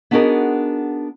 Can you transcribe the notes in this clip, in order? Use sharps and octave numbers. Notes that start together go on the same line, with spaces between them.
B3 D4 D#4 F#4 G#4 A#4